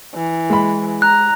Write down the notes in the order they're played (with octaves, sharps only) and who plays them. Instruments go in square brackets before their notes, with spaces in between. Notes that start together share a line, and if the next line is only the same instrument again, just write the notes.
[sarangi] E3
[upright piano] G#3 B5
[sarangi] A#5 [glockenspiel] F#6